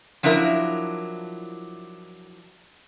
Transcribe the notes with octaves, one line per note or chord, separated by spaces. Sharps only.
F3 F#3 D4 E4 A#4